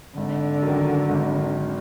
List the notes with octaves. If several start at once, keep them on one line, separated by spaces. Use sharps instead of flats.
G#1 D3
F#2 D#3
G#1